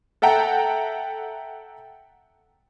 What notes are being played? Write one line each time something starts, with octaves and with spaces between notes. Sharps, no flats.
A4 E5 F#5 G5 A#5